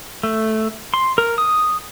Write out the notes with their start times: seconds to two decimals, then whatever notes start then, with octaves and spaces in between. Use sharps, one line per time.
0.23 A3
0.94 C6
1.18 A#4
1.38 D#6